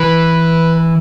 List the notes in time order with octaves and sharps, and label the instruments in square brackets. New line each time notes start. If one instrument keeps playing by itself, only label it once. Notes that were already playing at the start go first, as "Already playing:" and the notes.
Already playing: [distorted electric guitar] E3 [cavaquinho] B4